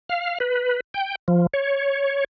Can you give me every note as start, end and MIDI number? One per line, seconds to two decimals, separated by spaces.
0.09 0.38 77
0.40 0.80 71
0.94 1.15 79
1.28 1.47 53
1.54 2.24 73